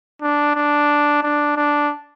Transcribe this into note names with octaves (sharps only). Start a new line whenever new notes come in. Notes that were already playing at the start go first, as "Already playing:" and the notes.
D4
D4
D4
D4